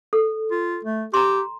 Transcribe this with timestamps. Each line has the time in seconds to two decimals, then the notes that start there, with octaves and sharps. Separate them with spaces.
0.13 A4
0.51 F4
0.85 A3
1.14 G4 A#5 C6